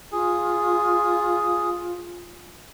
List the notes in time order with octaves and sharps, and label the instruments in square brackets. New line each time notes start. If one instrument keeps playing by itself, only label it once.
[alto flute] F4 [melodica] G#4